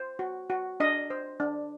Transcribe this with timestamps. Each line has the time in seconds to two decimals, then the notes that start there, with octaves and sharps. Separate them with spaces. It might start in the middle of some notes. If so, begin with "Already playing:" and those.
Already playing: C5
0.19 F#4
0.50 F#4
0.80 D4 D#5
1.10 C5
1.40 D4